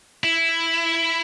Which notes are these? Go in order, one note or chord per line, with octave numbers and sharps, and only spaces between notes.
E4